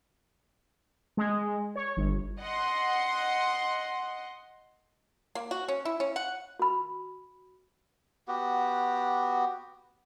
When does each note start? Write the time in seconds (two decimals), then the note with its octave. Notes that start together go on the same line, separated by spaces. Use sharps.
1.17 G#3
1.76 C#5
1.97 G1
2.39 D#5 F#5 C6
5.35 A#3
5.51 F#4
5.68 C#4
5.85 E4
6.00 C#4
6.16 F#5
6.60 F#4 B5
8.28 B3 F#4 G4